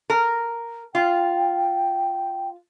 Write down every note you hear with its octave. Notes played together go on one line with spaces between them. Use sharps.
A#4
F4 G5